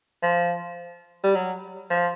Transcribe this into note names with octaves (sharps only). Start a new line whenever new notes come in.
F3
G3
F#3
F3